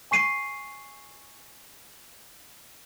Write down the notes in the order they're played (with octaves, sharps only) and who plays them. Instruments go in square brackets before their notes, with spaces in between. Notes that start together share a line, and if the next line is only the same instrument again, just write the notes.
[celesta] G#5 C#6 C7 D#7